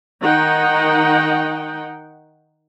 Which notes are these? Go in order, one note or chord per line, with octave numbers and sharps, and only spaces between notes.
D#3 D#4 F#5 G5